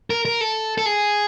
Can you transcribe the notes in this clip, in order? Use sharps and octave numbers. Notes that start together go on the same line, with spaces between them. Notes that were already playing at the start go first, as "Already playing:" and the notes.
A#4
A#4
A4
A4
G#4